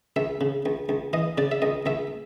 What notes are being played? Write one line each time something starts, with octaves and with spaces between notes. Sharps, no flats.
C#2 E5
C#3
C#2
C#2
E3 D#5
C#3 D5
E5
C#2 D#5
C#2 E5